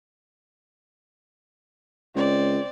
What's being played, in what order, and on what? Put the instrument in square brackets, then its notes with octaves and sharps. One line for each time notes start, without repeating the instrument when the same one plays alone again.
[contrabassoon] C#2 [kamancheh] C4 D5